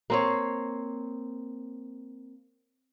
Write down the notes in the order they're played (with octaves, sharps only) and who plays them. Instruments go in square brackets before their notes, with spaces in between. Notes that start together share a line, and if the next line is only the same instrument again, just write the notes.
[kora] A#3 C4 C#5